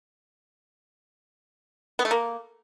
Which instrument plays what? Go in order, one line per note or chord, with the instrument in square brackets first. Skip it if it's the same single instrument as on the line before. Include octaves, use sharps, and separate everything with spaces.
[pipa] B3
A3
A#3